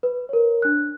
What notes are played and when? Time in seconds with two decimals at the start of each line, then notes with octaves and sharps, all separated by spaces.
0.03 B4
0.29 A#4 C#5
0.62 D4 F#6